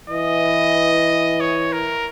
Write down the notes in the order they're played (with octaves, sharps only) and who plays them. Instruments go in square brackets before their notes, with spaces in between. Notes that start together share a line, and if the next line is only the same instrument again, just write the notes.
[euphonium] E3 [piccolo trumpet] D#5
[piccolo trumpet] C#5
A#4